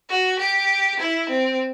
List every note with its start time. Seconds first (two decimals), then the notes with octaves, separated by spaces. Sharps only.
0.10 F#4
0.40 G4
1.00 E4
1.30 C4